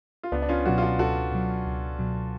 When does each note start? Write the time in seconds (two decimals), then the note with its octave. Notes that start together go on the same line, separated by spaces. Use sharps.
0.23 F4
0.32 C#2 B3 D4
0.42 D4
0.49 C#4 F4
0.66 B2 F#3 D4 F#4
0.78 F4
0.82 D4 F#4
0.99 C#2 F#4 A4
1.32 B2 F#3
1.66 C#2
1.99 B2 F#3